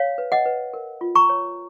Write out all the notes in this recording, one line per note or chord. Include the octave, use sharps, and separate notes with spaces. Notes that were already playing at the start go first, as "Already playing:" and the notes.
Already playing: C#5 F5
B4
D#5 F#5
B4
A#4
F4
A#5 C#6
C#5